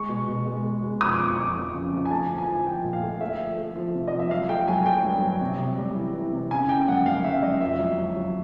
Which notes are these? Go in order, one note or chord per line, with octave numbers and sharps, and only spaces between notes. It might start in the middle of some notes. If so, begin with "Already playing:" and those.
Already playing: G#3 C#6
B2
B2
G#3
G#3
B2
F2 D#6
D6
F2
C#6
F2 D6
F2
C#3
F2
G#5
A3 A5
F3
G#5
F3
F3 G5
A#2
F5
A3
A3 E5
F3
A3
F3
C3
F3 D#5
E5
F#3 F5
A3 G5
F#3 G#5
A3 G5
G2
F#3
C3
C3
G3
E3
E3
C3
C#3 G#5
C#3 G5
F#2 F#5
F#2 F5
C#3 E5
F#2 D#5
F2 E5
F#3
F#3
F#3